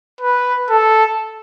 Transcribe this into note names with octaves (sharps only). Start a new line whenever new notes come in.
B4
A4